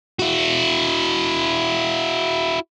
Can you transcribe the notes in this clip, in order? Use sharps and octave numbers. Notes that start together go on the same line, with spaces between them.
E4 F#4